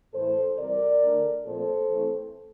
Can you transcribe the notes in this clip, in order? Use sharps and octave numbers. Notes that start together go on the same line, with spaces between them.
A2 E3 A3 A4 C5
C3 E3 G3 A#4 D5
D3 A3 D4
A#2 F3 A3 C4 A4 C5
E3 A3 C4